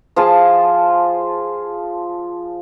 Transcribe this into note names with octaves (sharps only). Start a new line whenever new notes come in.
F3 F4 G#4 A5